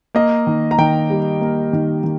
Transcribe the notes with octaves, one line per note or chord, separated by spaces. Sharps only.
A#3 D#5
D#3
A#5
D#3 G5
G3
A#3
D#3
D#3